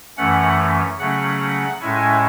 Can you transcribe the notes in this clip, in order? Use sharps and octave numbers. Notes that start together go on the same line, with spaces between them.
F#2 E3 A3 C#4 F#5
C#3 F#3 A3 C#4 F#5
A2 G#3 C#4 E4 G#5